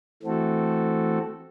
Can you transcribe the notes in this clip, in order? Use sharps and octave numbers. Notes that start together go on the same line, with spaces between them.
E3 A3 C4 F#4 A4